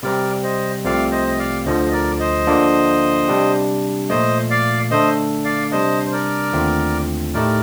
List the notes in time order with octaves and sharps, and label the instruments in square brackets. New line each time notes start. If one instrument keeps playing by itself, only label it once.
[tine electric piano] C3 G3 C4 [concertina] A#4 D5
[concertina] C5 D#5
[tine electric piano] C2 C3 F3 A3 C4 [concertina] D5 F5
[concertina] C5 D#5
D#5
D5 F5
[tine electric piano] D2 D3 F3 [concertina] C5 D#5
[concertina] D#5
A#4 D5
C5 D#5
[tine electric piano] D3 F3 A#3 D4 F4
C3 G3 D4 G4
[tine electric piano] A#2 F3 A3 [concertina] C5 D#5
[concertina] D5 F5
[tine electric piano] D3 A3 D4 A4 [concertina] C5 D#5
[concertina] D5 F5
[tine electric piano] C3 G3 D4 [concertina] C5 D#5
[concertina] C5
A#4 D5
[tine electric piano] D#2 D3 A3 C4 F4
[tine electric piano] A2 A3 D#4 G4 [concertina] A#4 D5